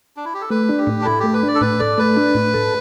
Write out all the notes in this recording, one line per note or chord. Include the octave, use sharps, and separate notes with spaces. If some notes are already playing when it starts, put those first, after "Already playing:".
D4
E4
G4
A4
A3 B4
D4
G4
A2
D4
E4 A4
A3 G4
B4
D4 D5
A4
A2 B4
A4 D5
A3 B4
D4
A2
A4